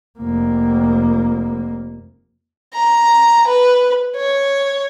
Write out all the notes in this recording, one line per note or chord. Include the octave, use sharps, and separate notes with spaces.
F1 A#3
A#5
B4
C#5